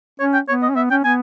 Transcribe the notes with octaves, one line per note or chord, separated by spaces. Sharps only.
C#4 C#5
G5
B3 C#5
D#5
C#4
B3 E5
C#4 G5
B3 G#5